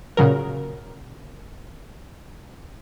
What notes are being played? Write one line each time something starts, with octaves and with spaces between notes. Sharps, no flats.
A#2 C#3 F#3 A#4